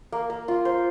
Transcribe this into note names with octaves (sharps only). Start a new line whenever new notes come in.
A#3
A#3
F4
C5